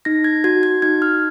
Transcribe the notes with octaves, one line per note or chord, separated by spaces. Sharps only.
D#4 A#6
G#6
F#4 G#6
G#6
D#4 G#6
F6